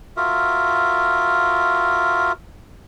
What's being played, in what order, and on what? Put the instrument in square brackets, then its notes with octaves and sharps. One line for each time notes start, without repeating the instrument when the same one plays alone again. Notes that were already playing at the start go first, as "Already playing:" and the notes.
[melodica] F4 F#4 A#4 E5